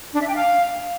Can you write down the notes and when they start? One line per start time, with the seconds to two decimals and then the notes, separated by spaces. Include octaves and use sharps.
0.13 D4
0.20 E5
0.27 G5
0.35 F5